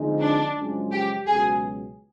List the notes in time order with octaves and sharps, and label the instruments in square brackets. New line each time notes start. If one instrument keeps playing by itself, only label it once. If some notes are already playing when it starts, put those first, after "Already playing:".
Already playing: [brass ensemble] D3 F3 G#3 C4 D#4
[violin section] D4
[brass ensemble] F#2 C#3 F3 G#3
[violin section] G4
[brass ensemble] C#2 B2 F#3 [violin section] G#4